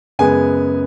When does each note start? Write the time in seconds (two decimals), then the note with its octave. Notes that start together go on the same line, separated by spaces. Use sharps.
0.19 F#2 C#3 G#3 B3 G#5